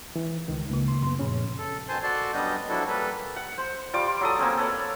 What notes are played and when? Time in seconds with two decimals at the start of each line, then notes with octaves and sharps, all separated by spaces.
0.16 E3
0.48 C#2 D#3
0.69 C#2 C#3 A#3
0.88 C6
1.02 F#2 B3 C6
1.19 F#2 A#2 F3 C#4
1.58 A4
1.89 B2 D#3 C5 G#5 A5 C6
2.03 F#4 A4 D5 A5 C6
2.33 F#2 G3 B3 D4 D#5 G6
2.69 F3 F#3 D4 E4 F#4 A4
2.87 G3 A#3 A4 B4
3.36 F#5
3.58 C5
3.94 G3 F4 D6
4.21 F#3 A4 D#6
4.39 A#3 C4 C#4
4.58 A4 B4 C#5 D5